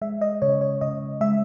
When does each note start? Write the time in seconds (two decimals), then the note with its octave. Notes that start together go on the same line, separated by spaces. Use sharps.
0.02 G#3 E5
0.21 D#5
0.42 C#3 C#5
0.61 C#5
0.81 C#3 D#5
1.21 G#3 E5